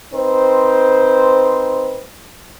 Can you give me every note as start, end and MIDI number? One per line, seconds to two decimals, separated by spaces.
0.14 2.01 60
0.14 2.01 63
0.14 2.01 71
0.14 2.01 72